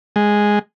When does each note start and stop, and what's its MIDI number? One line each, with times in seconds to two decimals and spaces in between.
0.16 0.59 56